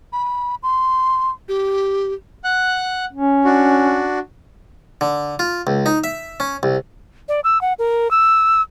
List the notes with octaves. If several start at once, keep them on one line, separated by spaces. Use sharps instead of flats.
B5
C6
G4
F#5 F#6
C#4
D4 F#4
D3
F4
C#2
D#4
E5
C#4
C2
D5
E6
F#5
A#4
E6